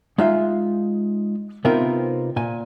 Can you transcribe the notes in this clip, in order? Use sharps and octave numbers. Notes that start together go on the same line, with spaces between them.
G#3 D#4 F4 E5 F5
C3 B3 C4 D#4 F4 A#4
A#2 G#5